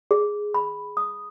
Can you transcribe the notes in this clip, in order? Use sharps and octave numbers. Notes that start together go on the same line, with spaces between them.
G#4
B5
D#6